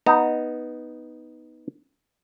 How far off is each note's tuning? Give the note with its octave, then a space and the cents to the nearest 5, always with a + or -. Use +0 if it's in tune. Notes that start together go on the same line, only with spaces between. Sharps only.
B3 -5 D#4 +0 A#5 -40